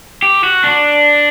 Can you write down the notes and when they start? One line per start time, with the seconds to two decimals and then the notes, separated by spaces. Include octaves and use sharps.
0.22 G4
0.44 F#4
0.64 D4